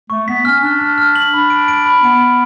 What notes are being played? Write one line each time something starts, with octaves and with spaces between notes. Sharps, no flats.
A3 C#6
B3 B6
C#4 F6
D4 F6
F6
F6
F#7
D4 B5
D7
D7
B5
B3 D7
D7